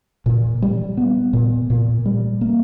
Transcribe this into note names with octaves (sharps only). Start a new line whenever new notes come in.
A#2
G3
B3
A#2
A#2
G3
A#3